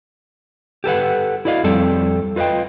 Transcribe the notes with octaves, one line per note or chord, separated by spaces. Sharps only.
G4 A4 B4 F#5
E4 F#4 D5 D#5 F5
F2 G3 C4 A4 D5
F4 B4 D#5 F5 G5